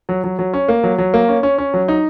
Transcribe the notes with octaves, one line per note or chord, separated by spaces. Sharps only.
F#3
F#3
F#3
C#4
A#3
F#3
F#3
A#3
C#4
C#4
C#4
F#3
D#4